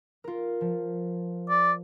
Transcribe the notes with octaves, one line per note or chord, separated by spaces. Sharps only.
F4 A#4
F3
D5